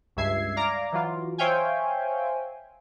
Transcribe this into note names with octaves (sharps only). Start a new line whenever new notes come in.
C#2 G2 E5 G#6 C7
D5 F5 A#5 D6
E3 F#3 F4
C5 C#5 E5 F5 G5 G#5